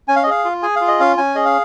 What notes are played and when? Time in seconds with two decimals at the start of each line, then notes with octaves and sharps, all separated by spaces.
0.08 C#4 G#5
0.16 F5
0.23 D#5
0.27 G#4 F5
0.45 F4
0.63 G#4 G#5
0.76 F4 F5
0.88 D#5
1.00 C#4 F5
1.17 C#4 G#5
1.35 G#4 D#5
1.45 F5